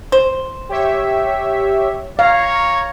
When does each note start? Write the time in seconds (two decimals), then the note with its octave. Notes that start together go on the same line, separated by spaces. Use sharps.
0.12 C5
0.69 G4 C#5 E5
2.19 C#5 F5 A#5